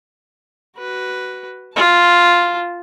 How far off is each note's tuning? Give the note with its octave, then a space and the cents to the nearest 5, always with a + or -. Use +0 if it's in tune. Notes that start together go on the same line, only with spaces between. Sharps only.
F#4 +20 B4 +0
F4 +0 A5 +0